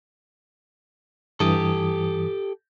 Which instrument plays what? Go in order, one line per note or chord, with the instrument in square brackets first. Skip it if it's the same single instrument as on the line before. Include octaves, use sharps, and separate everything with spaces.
[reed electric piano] G2 E3 D#6 [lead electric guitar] G4 A4